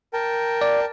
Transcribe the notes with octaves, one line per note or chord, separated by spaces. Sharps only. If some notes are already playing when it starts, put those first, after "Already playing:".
A#4 G5 A5
D5